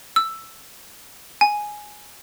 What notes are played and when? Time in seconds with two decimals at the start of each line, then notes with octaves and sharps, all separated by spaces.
0.16 E6
1.41 G#5